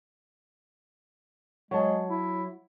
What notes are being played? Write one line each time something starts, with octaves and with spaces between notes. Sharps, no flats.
F#3 G#3 A5
E4